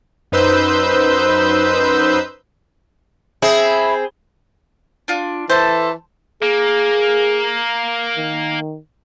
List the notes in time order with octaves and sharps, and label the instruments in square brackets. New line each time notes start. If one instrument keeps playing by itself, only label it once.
[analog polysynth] F#2 D#4 B4 C5 E6 G6
[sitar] C4 G#4 [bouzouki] E4
[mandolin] D4 F4
[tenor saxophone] E3 [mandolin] A4 A5 [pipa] C5
[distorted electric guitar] A#3 [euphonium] G#4
[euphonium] D#3